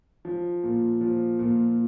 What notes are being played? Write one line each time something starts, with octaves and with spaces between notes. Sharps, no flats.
F3
A#2
F3
A#2